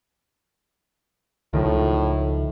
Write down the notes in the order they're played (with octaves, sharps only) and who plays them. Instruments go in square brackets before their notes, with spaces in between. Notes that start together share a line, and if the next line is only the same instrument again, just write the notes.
[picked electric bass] C#2 D#3 F3 [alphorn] A2